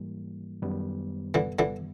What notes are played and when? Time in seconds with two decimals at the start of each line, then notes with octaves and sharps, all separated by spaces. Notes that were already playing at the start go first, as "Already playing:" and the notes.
Already playing: G#2 E3 G3 A#3
0.62 F#2 D#3 G3 B3
1.34 D3 E3
1.59 D3 E3